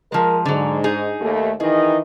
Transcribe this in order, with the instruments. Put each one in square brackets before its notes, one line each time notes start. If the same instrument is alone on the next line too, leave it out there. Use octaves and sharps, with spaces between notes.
[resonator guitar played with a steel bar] F3 G#3 [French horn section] A#4
[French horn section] G#2 [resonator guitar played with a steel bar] D3 F#3
[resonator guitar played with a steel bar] D#4 G#4
[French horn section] D#2 A3
[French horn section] D#3 E3 D#5 [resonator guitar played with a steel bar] G#4